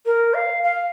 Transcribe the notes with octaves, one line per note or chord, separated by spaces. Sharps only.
A#4
F5
F5